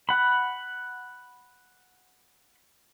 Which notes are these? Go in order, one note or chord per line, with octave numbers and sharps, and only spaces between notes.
F#5 B5